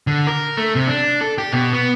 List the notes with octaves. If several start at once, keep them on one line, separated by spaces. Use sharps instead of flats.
D3
A#4
A3
C3
D4
A4
G4
B2
B3